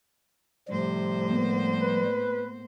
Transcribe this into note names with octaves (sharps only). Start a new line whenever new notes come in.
A2 C3 F3 G3 C5
A#3 B3
B4